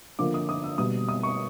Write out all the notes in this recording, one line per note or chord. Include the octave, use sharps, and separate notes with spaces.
D3 F3 A#3 D6
D#6
D#6
E6
B2 G3 A#3 D#6
D#6
C#6